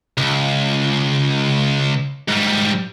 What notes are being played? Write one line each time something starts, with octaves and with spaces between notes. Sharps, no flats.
C#2
G#2 G3